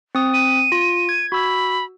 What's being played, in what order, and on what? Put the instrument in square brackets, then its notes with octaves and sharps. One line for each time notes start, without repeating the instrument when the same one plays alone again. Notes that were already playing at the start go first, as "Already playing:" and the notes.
[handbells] C4 D#6
[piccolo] D#7
[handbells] F4
G#6
[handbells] F#4 E6 [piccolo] B5